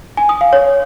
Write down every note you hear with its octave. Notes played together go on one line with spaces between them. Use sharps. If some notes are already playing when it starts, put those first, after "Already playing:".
G#5
D#6
F5
C#5